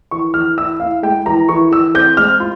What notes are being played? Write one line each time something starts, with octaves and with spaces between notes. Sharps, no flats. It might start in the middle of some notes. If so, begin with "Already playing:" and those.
E3 C#6
E3 F6
E4 E6
E4 F5
G#3 G5
E3 A#5
E3 C#6
E3 E6
C4 G6
G#3 F6
F4